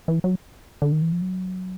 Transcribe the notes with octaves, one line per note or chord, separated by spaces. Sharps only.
E3
F#3
D3
D#3
E3
F3
F#3